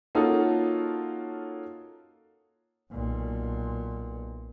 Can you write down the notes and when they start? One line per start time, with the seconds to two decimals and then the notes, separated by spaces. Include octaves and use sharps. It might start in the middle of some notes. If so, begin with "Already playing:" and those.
0.15 A#3 C#4 D#4 F4 F#4 A4
2.92 B1 A#2